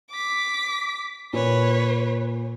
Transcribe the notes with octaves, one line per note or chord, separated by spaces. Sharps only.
D6 B6
A#2 B4 C#5